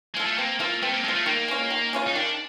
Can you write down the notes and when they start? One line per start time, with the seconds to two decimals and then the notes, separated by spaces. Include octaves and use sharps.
0.14 G#3 F4 A4
0.26 A3
0.38 A#3 C4
0.60 A#3 F4 A4
0.82 A3 C4
0.94 A#3
1.04 G#3 A4
1.08 F4
1.15 A3
1.26 D#3 A#3
1.48 G#3 C#4 F4
1.70 D#3
1.93 G#3 C#4 F4
2.08 D#4
2.15 D#3 D4